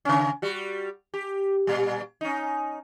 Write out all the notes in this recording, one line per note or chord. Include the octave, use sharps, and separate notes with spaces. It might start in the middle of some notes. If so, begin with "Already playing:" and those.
C#3 C#4
G3 F#4
G4
A#2 G3
C#4 D#4